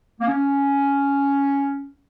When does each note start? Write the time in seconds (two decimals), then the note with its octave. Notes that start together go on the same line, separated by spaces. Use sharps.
0.20 A#3
0.28 C#4